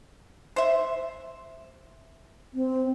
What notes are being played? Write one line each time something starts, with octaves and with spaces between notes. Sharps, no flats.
C5 E5
C4